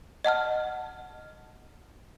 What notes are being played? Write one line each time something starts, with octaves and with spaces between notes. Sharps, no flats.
D#5 F#5 A5 F6